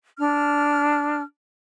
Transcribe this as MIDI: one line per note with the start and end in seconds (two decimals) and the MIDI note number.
0.18 1.21 62
0.18 1.21 89